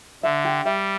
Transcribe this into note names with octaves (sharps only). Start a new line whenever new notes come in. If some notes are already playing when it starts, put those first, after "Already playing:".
D3 E5
G4
G3 E5